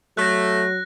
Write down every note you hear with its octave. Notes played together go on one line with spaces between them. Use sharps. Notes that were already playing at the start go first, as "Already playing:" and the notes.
F#3 A3 F#6 A#6